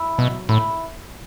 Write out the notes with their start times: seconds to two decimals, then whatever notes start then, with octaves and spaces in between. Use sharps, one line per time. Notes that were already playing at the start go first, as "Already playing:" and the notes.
Already playing: E4
0.18 B2 F#3
0.49 A2 E4